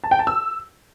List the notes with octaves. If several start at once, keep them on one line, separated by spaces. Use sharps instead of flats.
A5
G5
A5
E6